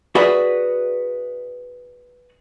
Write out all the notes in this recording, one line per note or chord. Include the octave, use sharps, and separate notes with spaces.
F#4 G#4 B4 D5 E5